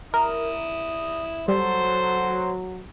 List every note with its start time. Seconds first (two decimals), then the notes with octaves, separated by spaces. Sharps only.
0.14 E4 A#4 D#6
1.48 F#3 G3 A4 C5